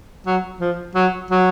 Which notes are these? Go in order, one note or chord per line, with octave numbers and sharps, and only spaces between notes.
F#3
F3
F#3
F#3